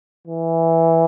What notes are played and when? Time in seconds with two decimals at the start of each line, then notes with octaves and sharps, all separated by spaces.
0.27 E3